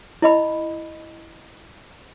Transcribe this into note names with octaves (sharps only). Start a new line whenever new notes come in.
E4 D#5 B5